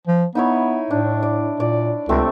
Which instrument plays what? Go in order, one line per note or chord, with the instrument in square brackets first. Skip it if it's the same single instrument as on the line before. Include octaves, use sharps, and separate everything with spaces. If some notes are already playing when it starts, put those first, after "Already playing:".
[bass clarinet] F3
[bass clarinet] B3 [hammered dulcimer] D#4 E4 C#5
[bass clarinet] A2 [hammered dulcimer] D4
[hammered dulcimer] D5
[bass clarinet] A#2 [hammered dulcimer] D5
[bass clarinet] C#2 [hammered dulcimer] C3 A3 C4